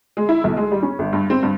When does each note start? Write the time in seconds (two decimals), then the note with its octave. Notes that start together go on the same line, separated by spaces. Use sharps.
0.17 G#3
0.29 E4
0.44 B1
0.57 G#3
0.72 G3
0.83 C#4
0.99 G1
1.13 G2
1.30 C4
1.43 G2